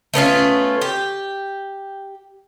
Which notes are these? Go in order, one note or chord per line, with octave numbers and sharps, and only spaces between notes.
A3 B3 C#4 F4
G4